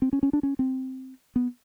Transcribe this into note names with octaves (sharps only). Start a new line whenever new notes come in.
C4
C#4
C#4
D4
C#4
C4
B3